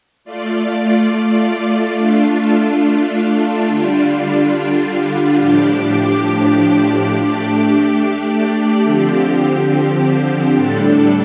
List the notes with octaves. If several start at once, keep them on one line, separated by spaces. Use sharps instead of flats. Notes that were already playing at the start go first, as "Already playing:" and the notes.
A3 F4 D5
A3 D4 F4
D3 G3 D4 F4
A2 F3 D4 G4 D5
A3 D4 G4 D5
D3 F3 C4 G4
A2 G3 D4 A4